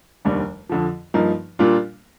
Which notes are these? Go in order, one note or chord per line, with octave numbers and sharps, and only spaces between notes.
F1 D#2 D#3 G3 D4
F2 D3 F3
G2 F3 A#3 D#4
A#2 G3 A#3 D4 F4